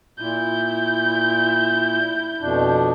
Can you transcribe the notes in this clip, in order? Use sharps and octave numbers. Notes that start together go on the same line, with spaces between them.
A#2 E4 G6
F2 B2 D4